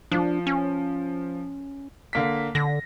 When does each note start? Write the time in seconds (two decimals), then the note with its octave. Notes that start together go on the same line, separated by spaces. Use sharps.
0.12 F3 D4
0.47 C#4
2.13 D3 A#3 B6
2.55 D3 A#6